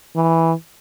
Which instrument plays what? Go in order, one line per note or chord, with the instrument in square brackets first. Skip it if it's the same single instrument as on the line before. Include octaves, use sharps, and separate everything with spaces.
[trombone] E3